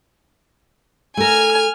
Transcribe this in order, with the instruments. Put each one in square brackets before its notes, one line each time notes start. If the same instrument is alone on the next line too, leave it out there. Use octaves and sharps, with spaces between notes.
[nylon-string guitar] A3 A#4 [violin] G#5 F6